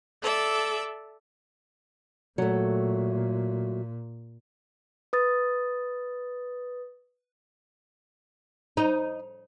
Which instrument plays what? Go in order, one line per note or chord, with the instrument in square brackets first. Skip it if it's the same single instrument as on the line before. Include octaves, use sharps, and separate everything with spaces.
[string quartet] A4 D5 E5
[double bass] A#2 [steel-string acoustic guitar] F#3 A3
[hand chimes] B4 D#6 A6
[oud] D#4